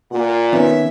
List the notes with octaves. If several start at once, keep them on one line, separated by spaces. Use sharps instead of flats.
A#2 F#5
D#3 B3 C#4 E5